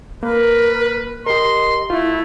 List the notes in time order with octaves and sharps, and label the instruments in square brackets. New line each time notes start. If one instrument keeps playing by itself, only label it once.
[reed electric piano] A#3 [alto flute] A#4 [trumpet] B4
[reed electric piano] G4 A#4 [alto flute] D#5 [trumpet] C6
[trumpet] A3 [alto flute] E4 [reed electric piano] F4